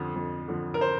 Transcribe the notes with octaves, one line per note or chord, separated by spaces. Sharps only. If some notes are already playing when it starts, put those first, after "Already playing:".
Already playing: F2 D3 F3
F2
D3 F3
A#4
C5